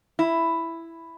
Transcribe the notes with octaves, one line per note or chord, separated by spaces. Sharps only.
E4